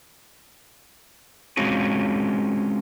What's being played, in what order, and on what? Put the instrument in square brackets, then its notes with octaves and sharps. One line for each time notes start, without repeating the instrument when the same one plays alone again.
[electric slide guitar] G#3 C4 C#4 F4 F#4 G#4